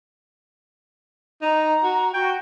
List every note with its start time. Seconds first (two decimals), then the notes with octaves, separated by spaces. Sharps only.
1.42 D#4 A#5
1.83 F#4
2.14 F#4 G5